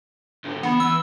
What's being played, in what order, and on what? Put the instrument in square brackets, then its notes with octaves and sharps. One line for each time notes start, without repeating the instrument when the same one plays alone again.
[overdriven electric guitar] G#2 D3
[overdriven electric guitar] E3 B5 [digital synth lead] B3
[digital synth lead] E6